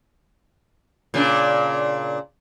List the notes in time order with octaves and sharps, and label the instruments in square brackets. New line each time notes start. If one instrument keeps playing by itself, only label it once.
[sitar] A#2 C#3 D4